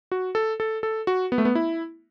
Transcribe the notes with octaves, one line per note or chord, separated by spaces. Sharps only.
F#4
A4
A4
A4
F#4
B3
A3
B3
E4